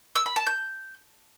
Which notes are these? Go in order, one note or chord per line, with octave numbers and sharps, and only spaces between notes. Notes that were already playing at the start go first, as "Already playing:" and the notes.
E6
B5
A5
G6